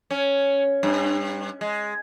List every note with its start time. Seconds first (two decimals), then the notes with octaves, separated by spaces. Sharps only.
0.11 C#4
0.83 G2
1.61 G#3